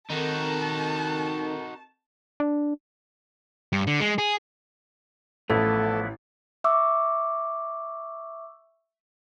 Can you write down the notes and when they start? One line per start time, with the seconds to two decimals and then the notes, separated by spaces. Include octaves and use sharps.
0.10 D#3 C4 D#4 F#4 A4 A#4 A5
2.40 D4
3.73 G2
3.87 D3
4.00 G#3
4.18 G#4
5.50 A1 F3 A3 B3 E4 A4
6.64 E5 C#6 D6 E6